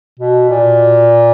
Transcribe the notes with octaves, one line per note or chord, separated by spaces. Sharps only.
B2
A#2